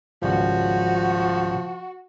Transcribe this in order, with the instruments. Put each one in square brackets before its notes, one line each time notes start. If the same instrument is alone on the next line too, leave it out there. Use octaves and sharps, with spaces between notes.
[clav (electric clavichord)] G#1 C#2 G3 [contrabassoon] F3 [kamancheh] F#4